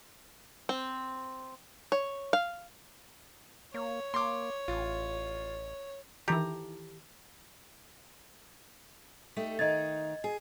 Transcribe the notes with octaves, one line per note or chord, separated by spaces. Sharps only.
C4
C#5
F5
A#3 C#5
A#3 C6 D6
A1 F4
D#3 E3 E4 G4 A4 A#5
A3 D#4 G4
D#3 D#4 D#5 G#6 A6
G#4